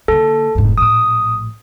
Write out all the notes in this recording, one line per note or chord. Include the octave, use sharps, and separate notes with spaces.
D3 A#3 A4
F1 G#2
A#1 A2 D#6